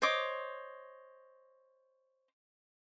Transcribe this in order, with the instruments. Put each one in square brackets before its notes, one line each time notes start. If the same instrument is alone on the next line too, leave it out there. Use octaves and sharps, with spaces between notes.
[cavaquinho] C5 C#5 D#5 D6